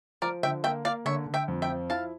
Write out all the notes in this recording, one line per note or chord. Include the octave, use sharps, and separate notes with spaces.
F3 A#4 D5
D3 E5 G5
A#3 E5 G5
A#3 D5 F5
D3 C#5 E5
D3
E5 G5
F2
E5 G5
F3
E4 F5 A5